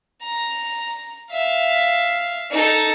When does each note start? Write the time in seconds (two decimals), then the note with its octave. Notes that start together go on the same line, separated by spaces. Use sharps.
0.23 A#5
1.32 E5 F5
2.52 D#4 A4